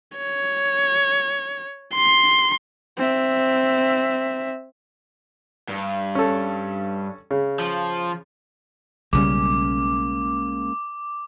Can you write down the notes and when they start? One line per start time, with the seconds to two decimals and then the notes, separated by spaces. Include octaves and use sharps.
0.18 C#5
1.95 C6
2.97 C4 E5
5.69 G2
6.15 C#4 A4
7.31 C#3
7.60 F3
9.13 B1 C#3 G3 G#3 A#3 C#4 D6